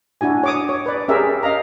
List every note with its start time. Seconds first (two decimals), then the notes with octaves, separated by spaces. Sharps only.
0.21 D4 E4 F#4 G#5
0.44 C#5 D6 D#6
0.69 C#5
0.86 B4 D5
1.08 C#4 G4 G#4 A#4 E5
1.43 D#5 F5 A#5